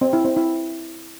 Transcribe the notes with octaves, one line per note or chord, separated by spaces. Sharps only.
C4
E4
C4
E4